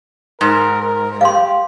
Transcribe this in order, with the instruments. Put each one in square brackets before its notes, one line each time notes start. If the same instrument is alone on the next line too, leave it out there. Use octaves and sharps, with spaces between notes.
[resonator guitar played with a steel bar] G#2 [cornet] A#4
[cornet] A#4
[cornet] G4 [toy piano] F5 C6